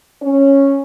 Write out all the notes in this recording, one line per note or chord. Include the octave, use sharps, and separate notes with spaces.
C#4